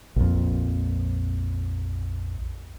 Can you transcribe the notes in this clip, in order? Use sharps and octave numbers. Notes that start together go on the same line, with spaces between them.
A#1 F2